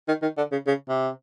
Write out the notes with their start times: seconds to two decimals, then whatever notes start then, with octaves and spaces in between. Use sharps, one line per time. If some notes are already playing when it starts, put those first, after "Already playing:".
0.08 D#3
0.22 D#3
0.37 D3
0.52 C#3
0.67 C#3
0.89 C3